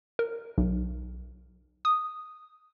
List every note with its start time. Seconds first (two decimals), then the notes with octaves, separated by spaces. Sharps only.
0.19 A#4
0.58 B1
1.85 D#6